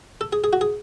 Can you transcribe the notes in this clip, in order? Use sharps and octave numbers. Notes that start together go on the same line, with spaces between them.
A4
G#4
G#4
F#4
G#4